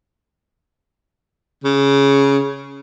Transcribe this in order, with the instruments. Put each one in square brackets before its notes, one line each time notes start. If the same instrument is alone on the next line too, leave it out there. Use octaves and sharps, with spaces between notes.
[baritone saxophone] C#3